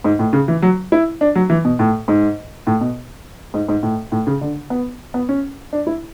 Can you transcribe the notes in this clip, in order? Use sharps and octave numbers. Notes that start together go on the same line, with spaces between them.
G#2
A2
C#3
E3
F#3
E4
D4
F#3
E3
B2
A2
G#2
A2
B2
G#2
G#2
A2
A2
C#3
D3
B3
B3
C#4
D4
E4